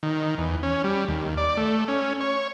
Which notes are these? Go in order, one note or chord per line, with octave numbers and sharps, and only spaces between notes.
D#3
E2
C#4
G3
D#2
D5
A3
C#4
C#5